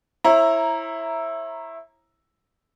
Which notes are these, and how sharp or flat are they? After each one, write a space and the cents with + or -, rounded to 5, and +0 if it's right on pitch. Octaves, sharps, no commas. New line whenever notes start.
E4 +0 C#5 -45 A#5 +0